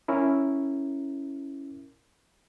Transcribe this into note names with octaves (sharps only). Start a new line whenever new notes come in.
C#4 E4 A#4